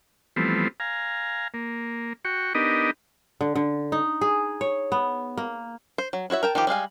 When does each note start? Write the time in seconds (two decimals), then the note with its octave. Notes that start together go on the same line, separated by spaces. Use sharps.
0.36 E3 F3 G3 A3 B3 C4
0.80 F5 G#5 A#5
1.54 A#3
2.25 F#4 G5 C#6
2.55 B3 D4 D#4 G4 A#4 D#5
3.41 D3
3.55 D3
3.92 D#4
4.21 G#4
4.61 C#5
4.92 B3
5.37 A#3
5.98 C5
6.13 F#3
6.30 E4 F#4 C#5 E5
6.43 A#4 G5 A5
6.55 D#3 F3 F4 G4
6.67 G3 G#3 F5 G#5